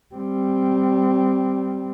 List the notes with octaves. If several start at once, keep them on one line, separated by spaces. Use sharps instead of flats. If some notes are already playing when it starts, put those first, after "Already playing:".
G3 C4